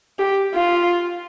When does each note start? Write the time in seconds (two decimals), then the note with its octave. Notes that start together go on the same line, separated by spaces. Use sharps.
0.19 G4
0.55 F4